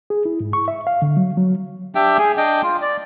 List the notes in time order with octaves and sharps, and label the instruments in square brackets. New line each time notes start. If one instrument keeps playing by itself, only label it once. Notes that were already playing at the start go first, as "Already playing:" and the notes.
[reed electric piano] G#4
E4
G#2
C#6
E5
F5
D3
F#3
F#3
[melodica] D4 G4 E5 G5
G#4
D4 D#5 G5
F4
D5